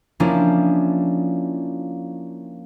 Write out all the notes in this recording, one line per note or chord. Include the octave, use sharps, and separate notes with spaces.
F3 A#3 C#4 D4 E4